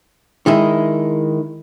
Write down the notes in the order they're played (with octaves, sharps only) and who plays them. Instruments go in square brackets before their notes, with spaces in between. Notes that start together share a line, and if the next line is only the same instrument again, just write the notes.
[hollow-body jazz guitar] D#3 G#3 E4